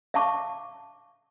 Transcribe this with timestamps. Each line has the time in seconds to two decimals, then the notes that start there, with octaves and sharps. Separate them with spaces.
0.14 E5 F5 A5 C#6 D6